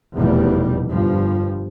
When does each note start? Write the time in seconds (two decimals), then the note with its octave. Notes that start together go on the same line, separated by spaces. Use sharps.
0.15 F1 E2 B2 G3
0.90 G1 G2 F3